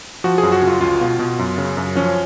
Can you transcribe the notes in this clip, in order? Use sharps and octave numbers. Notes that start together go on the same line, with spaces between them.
F3 F#4
G#4
F#2
F#4
C#3 F4
C#2 F4
B2
B2
F#2
C#3
F#2
F3 C#4